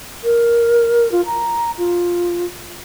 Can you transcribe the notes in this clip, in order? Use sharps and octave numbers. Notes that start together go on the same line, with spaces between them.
A#4
F4
A#5
F4